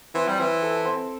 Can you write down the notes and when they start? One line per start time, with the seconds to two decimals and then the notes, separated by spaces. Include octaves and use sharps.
0.15 E3 C4
0.28 G3
0.39 E3 C4
0.62 A4
0.85 C4